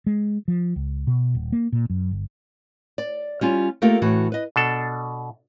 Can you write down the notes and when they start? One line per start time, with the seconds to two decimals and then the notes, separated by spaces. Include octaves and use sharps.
0.06 G#3
0.48 F3
0.76 C#2
1.07 B2
1.35 D#1
1.52 A#3
1.72 A#2
1.90 F#2
2.11 G1
2.98 D5
3.41 G3 C#4 F4
3.82 A3 A#3 F4 G4 A4 A#4
4.02 A2 E3 F#4
4.32 B4 D#5
4.56 B2 D4 A4